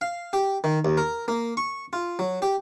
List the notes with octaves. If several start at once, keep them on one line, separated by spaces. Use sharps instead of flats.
F5
G4
D#3
D#2
A#4
A#3
C#6
F4
F#3
G4